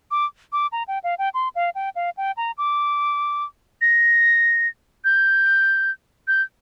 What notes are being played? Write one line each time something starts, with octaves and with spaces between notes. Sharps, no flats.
D6
D6
A#5
G5
F5
G5
C6
F5
G5
F5
G5
A#5
D6
A#6
G6
G6